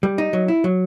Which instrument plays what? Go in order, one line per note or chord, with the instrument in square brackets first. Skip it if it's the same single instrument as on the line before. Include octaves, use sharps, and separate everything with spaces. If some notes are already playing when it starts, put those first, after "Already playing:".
[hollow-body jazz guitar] G3
D#4
F#3
E4
F#3